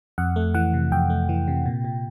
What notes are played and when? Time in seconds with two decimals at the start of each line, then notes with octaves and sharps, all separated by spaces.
0.18 F2 F#5
0.36 A3
0.54 E3 F#5
0.74 C3
0.92 F2 G5
1.10 A3
1.29 E3
1.48 C3
1.66 A#2
1.84 A#2